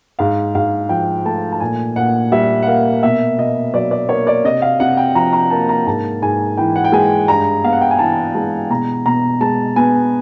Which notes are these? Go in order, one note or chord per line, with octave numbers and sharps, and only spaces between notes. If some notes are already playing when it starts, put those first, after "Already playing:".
G#2 F5
G#2 F5
F3 G5
A3 A5
A5
A#2 G#5
A#2 F#5
G3 E5
F#5
A#3 F5
B2 E5
B2 D#5
F#3 D5
D5
A#3 C#5
D5
C3 D#5
F5
C3 F#5
G5
F3 A#5
A#5
A#3 A5
A#5
G#2 A5
G#2 G#5
E3 G5
F#5
G5
G#3 G#5
G2 A#5
B3 F5
F#5
G5
G#5
E3 A5
G#3 A5
B2 A#5
B2 A#5
G#3 A5
B3 G#5